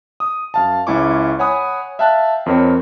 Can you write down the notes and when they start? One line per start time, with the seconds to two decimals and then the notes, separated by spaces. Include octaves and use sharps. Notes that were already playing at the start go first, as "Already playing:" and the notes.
0.20 D#6
0.54 F#2 F5 A5
0.87 C#2 C#4 E4 G#5 C#6 D6
1.39 C#5 F#5 G#5 B5 D#6
1.99 E5 F5 G5 A5 F#6
2.46 F2 C4 A#4 C#5 G5